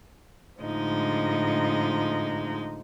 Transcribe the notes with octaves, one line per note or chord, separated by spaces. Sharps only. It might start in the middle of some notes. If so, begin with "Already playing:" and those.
A2 D3 F3 G#3 D#4